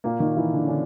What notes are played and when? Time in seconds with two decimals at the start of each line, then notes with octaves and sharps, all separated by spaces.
0.04 A#2 A#3
0.20 D#3 D#4
0.37 E3 E4
0.53 D3 D4
0.64 C#4
0.69 D3 D4